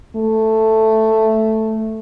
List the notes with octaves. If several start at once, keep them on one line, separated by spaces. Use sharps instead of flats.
A3